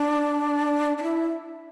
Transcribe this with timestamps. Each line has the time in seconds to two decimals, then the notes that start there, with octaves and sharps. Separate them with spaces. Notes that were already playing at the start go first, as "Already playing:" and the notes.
Already playing: D4
0.98 D4
1.03 E4